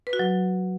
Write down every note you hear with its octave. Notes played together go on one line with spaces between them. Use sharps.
B4
F#4
F#3